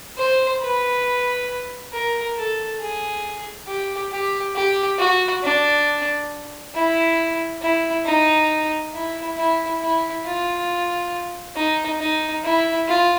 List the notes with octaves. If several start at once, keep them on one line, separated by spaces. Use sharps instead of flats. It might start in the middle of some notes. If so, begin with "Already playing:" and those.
C5
B4
A#4
A4
G#4
G4
G4
G4
F#4
D4
E4
E4
D#4
E4
E4
E4
F4
D#4
D#4
E4
F4